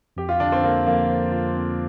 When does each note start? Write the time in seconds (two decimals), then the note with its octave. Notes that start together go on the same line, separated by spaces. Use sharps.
0.17 F2 G4
0.29 F4
0.40 D3 D4
0.52 C4
0.64 D3 A#3
0.87 F2 A#3
1.10 C5
1.32 F4
1.56 C4